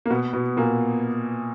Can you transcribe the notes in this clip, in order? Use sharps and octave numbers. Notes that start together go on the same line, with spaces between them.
A#3
B2 B3
B2 B3
A#2 A#3